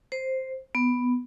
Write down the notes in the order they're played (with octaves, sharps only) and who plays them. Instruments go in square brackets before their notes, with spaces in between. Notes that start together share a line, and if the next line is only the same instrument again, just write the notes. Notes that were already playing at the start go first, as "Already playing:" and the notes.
[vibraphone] C5
B3